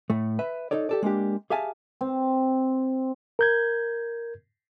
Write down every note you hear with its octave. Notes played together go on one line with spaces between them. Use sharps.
A2 A3
B4 E5
D#4 A4 C#5 D5
G4 A4 D5
G#3 A#3 D4 G4
G4 G#4 E5 F5 G#5 A5
C4
A#4 G6 G#6